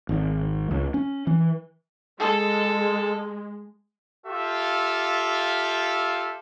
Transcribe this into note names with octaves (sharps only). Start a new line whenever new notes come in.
G#1
C#2
C#4
E3
G#3 A4
F4 G4 A4 E5 F5